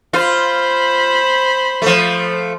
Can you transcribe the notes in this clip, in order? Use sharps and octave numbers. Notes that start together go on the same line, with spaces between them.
F4 C5 B5
F3 A3